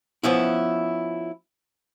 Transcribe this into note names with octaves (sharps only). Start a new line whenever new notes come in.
F3 B3 C#4 E4